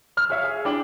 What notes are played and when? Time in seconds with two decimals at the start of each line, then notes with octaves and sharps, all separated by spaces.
0.17 E6 F6
0.30 G#4 C#5 E5 F5
0.44 G#4
0.65 D4 E4 G5 D6 F#7